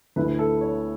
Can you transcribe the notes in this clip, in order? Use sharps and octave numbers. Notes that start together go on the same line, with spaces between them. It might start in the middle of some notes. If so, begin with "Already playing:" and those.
D2 D3 A3 E4 B4
A4
C#5